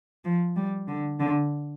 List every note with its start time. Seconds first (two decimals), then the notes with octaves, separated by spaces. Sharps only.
0.24 F3
0.56 G3
0.87 D3
1.19 D3